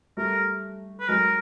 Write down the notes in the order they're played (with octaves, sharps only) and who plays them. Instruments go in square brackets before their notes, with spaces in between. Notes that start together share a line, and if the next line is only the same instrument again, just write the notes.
[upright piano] G3 A3 [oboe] A#4
[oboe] B4
[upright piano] F#3 G#3 [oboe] A#4